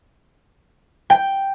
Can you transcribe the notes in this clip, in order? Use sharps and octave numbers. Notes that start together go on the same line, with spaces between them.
G5